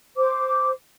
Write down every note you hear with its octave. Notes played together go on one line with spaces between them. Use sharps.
C5 D6